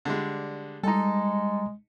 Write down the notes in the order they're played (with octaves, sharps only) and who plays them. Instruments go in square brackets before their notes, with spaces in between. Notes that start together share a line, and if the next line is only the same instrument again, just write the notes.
[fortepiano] D3 G3 G#3
[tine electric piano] G3 A#5 [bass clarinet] G#3 [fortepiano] D#4 A4